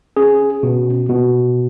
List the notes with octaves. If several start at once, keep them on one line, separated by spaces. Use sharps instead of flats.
C#4 G#4
B2
B2